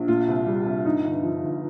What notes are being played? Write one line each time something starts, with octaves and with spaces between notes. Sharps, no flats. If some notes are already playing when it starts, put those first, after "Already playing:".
Already playing: A#1
A#2 F4
C2
G3
C2
G2 D#4
G1
F3
G1